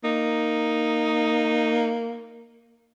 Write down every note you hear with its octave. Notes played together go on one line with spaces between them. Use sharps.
A#3 D#4